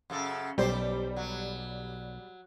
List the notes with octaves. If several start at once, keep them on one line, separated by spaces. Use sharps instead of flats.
F#2 C#3 A4
B1 G3 G4 C5
F#3